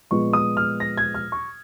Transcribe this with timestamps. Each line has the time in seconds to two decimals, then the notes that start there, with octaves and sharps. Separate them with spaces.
0.11 A#2 F3 G#3 B3 C#6
0.33 D#6
0.57 F6
0.80 A#6
0.97 G#6
1.15 F6
1.32 C#6